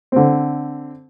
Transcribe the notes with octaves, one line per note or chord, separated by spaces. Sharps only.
D3 C4